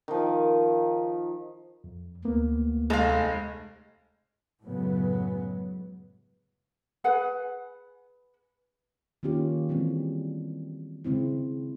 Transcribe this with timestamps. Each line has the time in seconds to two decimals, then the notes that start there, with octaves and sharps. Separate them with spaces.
0.08 D#3 F3
1.84 F2
2.25 D2 A#3 B3
2.90 F1 G#3 A4 F5
4.64 F#2 A2 C#3 F#3 G#3 B3
7.04 G#4 B4 F#5
9.23 D#3 A#3 C#4 F4 G4
9.69 E3 G3 G#3 C4 E4
11.04 C#3 G#3 C4 E4